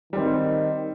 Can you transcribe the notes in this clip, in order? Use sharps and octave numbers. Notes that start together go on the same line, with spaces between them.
D#3 G3 C4